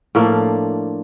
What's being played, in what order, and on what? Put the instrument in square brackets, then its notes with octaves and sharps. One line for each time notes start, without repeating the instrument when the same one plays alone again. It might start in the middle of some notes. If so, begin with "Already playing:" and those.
[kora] A2 F3 A#3 D4